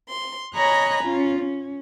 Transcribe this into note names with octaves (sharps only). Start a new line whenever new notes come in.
C6
C#5 D#5 G#5 A#5 B5 F#6
C#4 F4
C#4